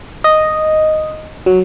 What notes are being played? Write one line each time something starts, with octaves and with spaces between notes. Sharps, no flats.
D#5
F#3